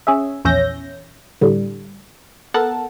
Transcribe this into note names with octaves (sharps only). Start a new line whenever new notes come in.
C#4 G#4 E5
A#1 E2 C#4 E5 G6 A#6
A2 D3 G3
B3 A4 A#4 F#5 A5